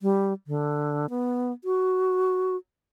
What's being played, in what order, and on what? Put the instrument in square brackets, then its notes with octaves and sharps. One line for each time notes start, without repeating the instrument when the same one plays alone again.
[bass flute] G3
D3
B3
F#4